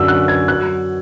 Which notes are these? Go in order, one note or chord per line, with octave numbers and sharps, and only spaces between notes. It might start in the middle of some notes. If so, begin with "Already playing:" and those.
Already playing: F#2 D3 F#3 E6
F#6
G#6
F#3 F#6